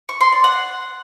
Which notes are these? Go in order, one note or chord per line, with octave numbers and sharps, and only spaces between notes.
C#6
C6
D5
F#5